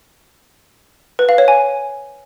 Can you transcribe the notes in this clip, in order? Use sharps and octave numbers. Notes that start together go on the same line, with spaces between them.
B4
F5
C#5
G#5